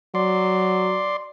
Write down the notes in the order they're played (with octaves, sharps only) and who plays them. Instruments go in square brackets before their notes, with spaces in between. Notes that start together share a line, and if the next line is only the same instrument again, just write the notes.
[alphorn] F#3 [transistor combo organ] D5 C6